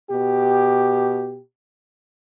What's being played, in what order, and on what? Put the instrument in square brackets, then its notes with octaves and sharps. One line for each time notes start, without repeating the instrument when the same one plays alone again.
[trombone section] B2 G4